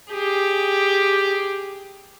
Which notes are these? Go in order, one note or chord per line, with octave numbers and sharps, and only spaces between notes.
G4 G#4